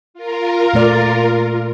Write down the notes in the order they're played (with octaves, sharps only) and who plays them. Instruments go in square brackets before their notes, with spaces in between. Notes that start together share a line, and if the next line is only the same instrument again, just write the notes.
[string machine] F4 A#4
[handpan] A#2 A3 D5